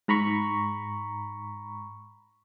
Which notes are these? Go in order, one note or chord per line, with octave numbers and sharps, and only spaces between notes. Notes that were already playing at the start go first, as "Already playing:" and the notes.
G#2 A#5 B5 C#6